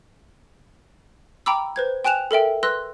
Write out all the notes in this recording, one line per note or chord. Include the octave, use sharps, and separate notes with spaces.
G5 A#5 B5 D6 E6
B4 C5 G#6
G5 G#5 F#6 E7 F7
A4 A#4 E5 G5
B4 C6 E6 F#6 A#6